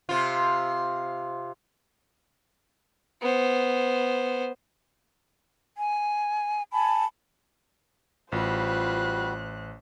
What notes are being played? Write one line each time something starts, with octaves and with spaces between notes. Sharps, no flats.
C3 F4
B3 C5
G#5
G#5 A5 B5
A1 G3 F4 F#4 B4 C5 F#6